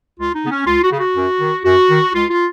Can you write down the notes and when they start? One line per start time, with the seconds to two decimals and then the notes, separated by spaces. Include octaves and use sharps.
0.18 C#2 F4
0.35 D#4
0.44 C#3 B3
0.51 C#4
0.67 C#2 F4
0.84 F#4
0.92 C#3
1.00 F#4
1.16 F#2
1.41 D#3
1.65 F#2 F#4
1.90 D#3
2.14 C#2 F4
2.30 F4